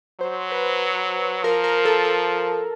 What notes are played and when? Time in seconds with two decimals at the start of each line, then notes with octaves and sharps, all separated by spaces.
0.20 F#3 C5
0.52 B4
1.43 F3 A#4
1.64 A#4
1.85 A4
2.05 A4